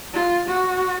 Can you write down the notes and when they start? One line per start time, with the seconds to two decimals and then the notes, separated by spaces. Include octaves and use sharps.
0.14 F4
0.48 F#4